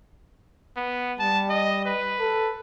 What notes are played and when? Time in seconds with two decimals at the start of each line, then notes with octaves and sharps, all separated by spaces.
0.76 B3
1.19 G3 A5
1.49 D#5
1.85 B4
2.20 A4